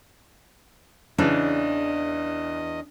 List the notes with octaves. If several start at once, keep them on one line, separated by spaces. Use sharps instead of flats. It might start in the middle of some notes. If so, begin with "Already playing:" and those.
E2 C#3 E3 D4 D#5